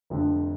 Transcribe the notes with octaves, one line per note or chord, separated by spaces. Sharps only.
F1 F2 D3